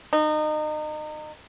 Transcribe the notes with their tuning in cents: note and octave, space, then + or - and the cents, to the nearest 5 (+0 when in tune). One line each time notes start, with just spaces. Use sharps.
D#4 -30